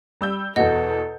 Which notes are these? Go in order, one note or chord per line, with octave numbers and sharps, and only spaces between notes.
G3 E6 G6
E2 B2 A4 D#5 F#5